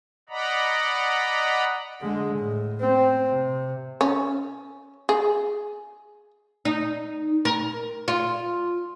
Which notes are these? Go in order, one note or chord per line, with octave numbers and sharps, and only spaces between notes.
D5 D#5 F#5 A#5 B5
D3 G#3
A2
C4
C3
C#4
G#4
D#4
A#4
F4